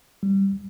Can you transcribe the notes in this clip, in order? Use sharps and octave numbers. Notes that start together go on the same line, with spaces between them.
G3